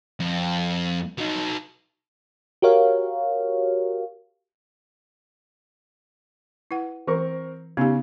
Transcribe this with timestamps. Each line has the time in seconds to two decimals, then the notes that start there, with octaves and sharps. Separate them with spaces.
0.20 F2
1.18 F#3 D#4
2.62 F#4 G4 A#4 C#5 F5
6.71 E4 B4 F#5
7.07 E3 C4 A#4 C#6
7.77 C#3 B3 D#4 G4